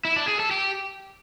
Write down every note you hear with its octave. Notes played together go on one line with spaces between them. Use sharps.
E4
D4
G#4
A4
G4